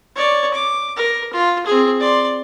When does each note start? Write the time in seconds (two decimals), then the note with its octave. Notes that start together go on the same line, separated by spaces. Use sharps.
0.16 C#5 D5
0.54 D6
0.96 A#4
1.33 F4
1.66 C4 G#4
2.00 D5 C6